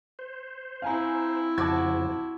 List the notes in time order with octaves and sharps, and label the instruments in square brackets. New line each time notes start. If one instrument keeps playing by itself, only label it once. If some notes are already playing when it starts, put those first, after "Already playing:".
[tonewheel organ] C5
[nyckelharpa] C4 E4 [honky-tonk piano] F5 G#5 A#5
[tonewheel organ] F2 C#3 F3 [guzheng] F#4 [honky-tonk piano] A5 D6 G#6